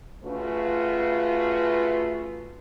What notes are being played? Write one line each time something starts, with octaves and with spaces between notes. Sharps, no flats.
C#3 A3 F4 F#4 B4